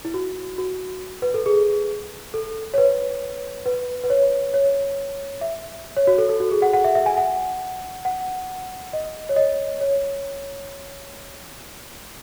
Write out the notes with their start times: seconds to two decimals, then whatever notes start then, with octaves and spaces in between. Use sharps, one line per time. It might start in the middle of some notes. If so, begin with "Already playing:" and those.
0.05 E4
0.14 F#4
0.58 F#4
1.22 B4
1.34 A4
1.46 G#4
2.34 A4
2.74 C#5
2.78 B4
3.66 B4
4.04 B4
4.10 C#5
4.54 C#5
5.41 E5
5.97 C#5
6.07 F#4
6.18 A4
6.29 A4
6.40 F#4
6.51 G#4
6.62 F#5
6.73 F#5
6.84 E5
6.95 E5
7.06 G#5
7.17 F#5
8.05 F#5
8.93 D#5
9.29 C#5
9.36 D#5
9.81 C#5